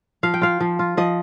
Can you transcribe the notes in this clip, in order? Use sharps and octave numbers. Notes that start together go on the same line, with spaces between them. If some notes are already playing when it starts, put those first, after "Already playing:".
F3 F5
G5
F4 F5
F3
F4
F3 D#5